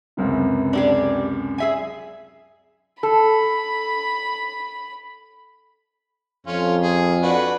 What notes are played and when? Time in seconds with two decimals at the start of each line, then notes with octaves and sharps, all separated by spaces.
0.17 C#2 F#2 C3
0.73 D4 G4 G#4
1.58 G#4 E5 G#5
3.03 A4 B5
6.47 F2 C#4 F4
6.83 G#4
7.22 D4 F#4 B4